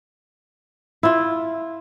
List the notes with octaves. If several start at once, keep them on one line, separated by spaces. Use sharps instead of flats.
E4 F4